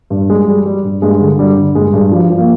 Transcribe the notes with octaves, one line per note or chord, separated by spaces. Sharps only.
G2
G3 G#3
G3
G3
G2
G2 G#3
D3
G2 G3
D3
G2 G#3
G2
F3 G3
F3
A#3